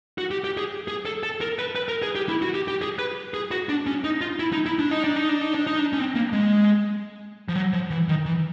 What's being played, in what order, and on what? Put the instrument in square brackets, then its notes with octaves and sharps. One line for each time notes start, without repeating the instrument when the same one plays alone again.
[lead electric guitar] F#4
G4
G4
G#4
G#4
A4
A4
A#4
B4
B4
A#4
G#4
G4
E4
F#4
G4
G4
G#4
B4
G#4
F#4
D4
C#4
D#4
F4
E4
D#4
E4
D4
D#4
D4
D#4
D4
D#4
D4
D#4
D4
C#4
C4
A#3
G#3
F3
F#3
F3
E3
D#3
E3